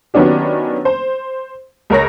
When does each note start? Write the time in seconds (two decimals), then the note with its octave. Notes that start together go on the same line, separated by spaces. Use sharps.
0.14 D#3 F#3 B3 C#4 D4 G4
0.85 C5
1.90 C#2 A#4 C#5 A#6